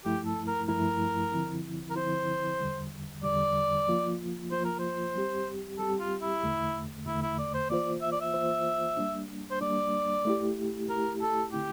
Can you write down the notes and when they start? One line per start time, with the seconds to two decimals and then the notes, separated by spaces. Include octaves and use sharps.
0.05 G2 F3 A3 E4 G4
0.26 A4
0.47 A#4
0.68 G2 F3 A3 E4 A#4
1.32 D3 F3 C4 E4
1.90 A#4
1.95 D3 F3 C4 E4 C5
2.60 E2 D3 G3
3.23 E2 D3 G3 D5
3.88 F3 A#3 F4
4.51 F3 A#3 F4 C5
4.65 A#4
4.79 C5
5.15 G3 C4 G4
5.78 G3 C4 G4 A4
6.00 F4
6.21 E4
6.43 E2 D3 A3
7.06 E2 D3 A3 E4
7.22 E4
7.39 D5
7.54 C5
7.69 E3 A#3 F4 C5 D5
8.01 E5
8.12 D5
8.21 E5
8.34 E3 A#3 F4 C5
8.97 G3 A#3 D4
9.51 C5
9.61 G3 A#3 D4 D5
10.25 A3 E4 G4
10.89 A3 E4 G4 A#4
11.21 A4
11.52 D3 A3 C4 E4 G4